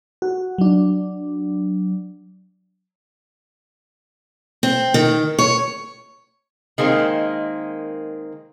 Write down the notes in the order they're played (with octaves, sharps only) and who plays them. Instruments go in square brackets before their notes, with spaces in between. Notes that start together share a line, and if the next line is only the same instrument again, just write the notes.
[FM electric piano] F#4
F#3 D4
[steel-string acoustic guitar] C4
D#3
C#5
[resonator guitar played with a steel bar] D#3 G#3 A#3 C4